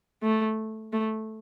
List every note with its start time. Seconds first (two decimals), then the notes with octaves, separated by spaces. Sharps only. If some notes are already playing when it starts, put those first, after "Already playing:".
0.23 A3
0.93 A3